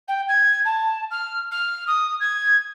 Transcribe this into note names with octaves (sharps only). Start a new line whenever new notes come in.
G5
G#6
A5
F6
F6
D#6
G#6